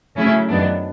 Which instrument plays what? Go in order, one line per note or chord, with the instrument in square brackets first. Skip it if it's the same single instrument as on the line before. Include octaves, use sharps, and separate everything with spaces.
[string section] C#3 F#3 A3 C#4 E4
F#2 D#3 F#3 B3 D4